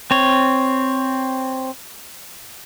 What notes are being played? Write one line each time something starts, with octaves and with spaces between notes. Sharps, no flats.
C4 C#5